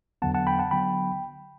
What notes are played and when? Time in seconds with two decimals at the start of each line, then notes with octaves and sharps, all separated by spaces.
0.22 E2 D3 F#3 B3 F#5 A5
0.34 F#5 A5
0.47 G5 B5
0.59 F#5 A5
0.71 D3 F#3 B3 G5 B5